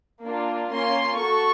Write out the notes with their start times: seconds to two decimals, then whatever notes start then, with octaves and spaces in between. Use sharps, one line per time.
0.25 A#3 D4 F4
0.72 A#3 C#4 F4 C6
1.19 F#4 A4 C#6